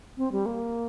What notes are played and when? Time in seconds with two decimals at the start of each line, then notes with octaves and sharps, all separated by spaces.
0.18 C4
0.32 G3
0.46 A#3